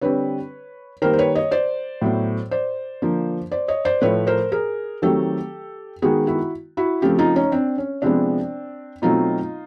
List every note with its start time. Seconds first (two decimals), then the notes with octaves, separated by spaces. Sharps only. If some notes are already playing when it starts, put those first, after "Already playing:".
0.01 D3 G3 C4 B4 C#5
1.02 D#3 G3 A#3 A#4 C5
1.13 C5
1.18 B4 C#5
1.35 C#5 D#5
1.51 C5 D5
2.02 A2 F#3 B3
2.51 C5 D5
3.02 D3 F3 A#3
3.51 C5 D5
3.68 C#5 D#5
3.85 C5 D5
4.02 A2 F3 A3 B4 C#5
4.27 A#4 C5
4.52 G#4 A#4
5.02 D#3 F#3 A3 C4 G4 A4
6.02 D#3 G#3 B3 F#4 G#4
6.27 E4 F#4
6.77 E4 F#4
7.02 C#3 F3 A3 C4 F4 G4
7.18 D#4 F4
7.36 C#4 D#4
7.52 C4 D4
7.78 C#4
8.02 C3 F3 G#3 B3 C4 D4
9.02 B2 F#3 A3 C4 D#4 F4